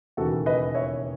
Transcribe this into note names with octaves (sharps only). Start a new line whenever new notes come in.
E1 D#2 C#3 E3 F#4 A4
B4 D#5
C#5 E5